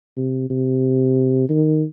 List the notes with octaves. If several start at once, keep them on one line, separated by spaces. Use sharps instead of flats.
C3
C3
D#3